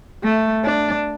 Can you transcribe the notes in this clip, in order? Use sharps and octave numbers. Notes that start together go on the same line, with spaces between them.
A3
D4